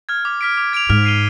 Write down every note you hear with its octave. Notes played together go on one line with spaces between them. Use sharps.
F6 G#6
D6
F6 B6 D7
D6
G#6 D7 F7
G#2 F6
C7 D#7 G7